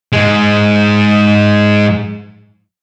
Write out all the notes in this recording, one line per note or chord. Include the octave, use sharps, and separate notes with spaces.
G#2 G#3